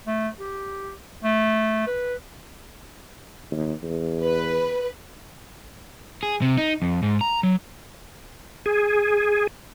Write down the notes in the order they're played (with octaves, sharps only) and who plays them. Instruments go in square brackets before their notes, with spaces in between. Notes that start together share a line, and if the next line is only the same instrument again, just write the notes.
[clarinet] A3
G4
A3
B4
[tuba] D#2
E2
[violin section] B4
[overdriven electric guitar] G#4
C3
D#4
F2
G#2
A#5
F#3
[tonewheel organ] G#4